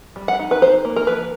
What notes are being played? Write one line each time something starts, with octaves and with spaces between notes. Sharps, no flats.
G3
F#5
D#4
B4
D#4 C5
A#3
A#4
F3 B4